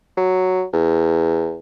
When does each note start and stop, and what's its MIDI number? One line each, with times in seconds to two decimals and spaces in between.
0.17 0.64 54
0.73 1.58 40